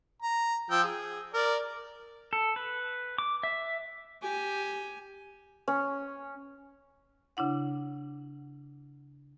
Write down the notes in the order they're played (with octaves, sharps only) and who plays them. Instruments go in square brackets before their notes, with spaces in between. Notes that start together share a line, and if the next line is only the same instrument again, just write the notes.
[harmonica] A#5
F3 G5 E6
G#4
A#4 D5
[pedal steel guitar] A4
B4
D6
E5
[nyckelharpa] G4 G#5
[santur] C#4
[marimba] C#3 D4 E4 F#5